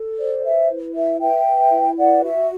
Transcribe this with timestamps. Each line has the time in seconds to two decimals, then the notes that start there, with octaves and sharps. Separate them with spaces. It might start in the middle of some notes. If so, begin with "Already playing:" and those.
Already playing: A4
0.19 C5 D5
0.44 B4 E5
0.70 E4
0.95 B4 E5
1.20 B4 E5 G5
1.46 B4
1.72 E4
1.97 B4 D5 F#5
2.23 F#4 E5